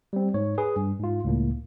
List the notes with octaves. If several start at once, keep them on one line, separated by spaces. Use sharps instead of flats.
G3 C4
G#2 C#5
G#4 B4
G2
G#2 F4
C#2 A2 A#3